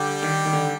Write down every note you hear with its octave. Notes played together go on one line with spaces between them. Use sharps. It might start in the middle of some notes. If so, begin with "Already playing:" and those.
Already playing: D3 G3 G4
D#3
D#3
D3